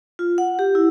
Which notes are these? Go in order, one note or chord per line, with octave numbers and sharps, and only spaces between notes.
F4
F#5
G4
E4